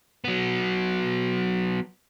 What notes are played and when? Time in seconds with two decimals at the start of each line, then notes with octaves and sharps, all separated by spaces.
0.24 F#3 B3